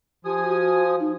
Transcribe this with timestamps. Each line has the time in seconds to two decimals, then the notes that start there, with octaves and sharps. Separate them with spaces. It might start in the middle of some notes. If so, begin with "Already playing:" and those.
0.25 F3 G4 G#5 D#6
0.46 F#4
1.00 D#4